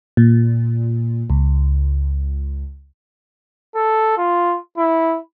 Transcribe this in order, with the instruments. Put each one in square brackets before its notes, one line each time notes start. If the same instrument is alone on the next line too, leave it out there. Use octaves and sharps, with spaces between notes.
[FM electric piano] A#2
C#2
[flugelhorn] A4
F4
E4